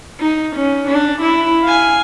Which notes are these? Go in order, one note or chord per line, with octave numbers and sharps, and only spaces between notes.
D#4
C#4
D4
E4
F5 G#5